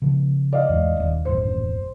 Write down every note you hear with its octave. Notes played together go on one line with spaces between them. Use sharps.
C#3 F3
D5 D#5 F5
E2 G#2
D#1 D#2
D#1 A1 F#2 C5